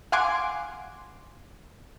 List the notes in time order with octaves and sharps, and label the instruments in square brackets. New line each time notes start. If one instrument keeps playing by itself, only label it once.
[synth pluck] F5 F#5 G#5 C6 D6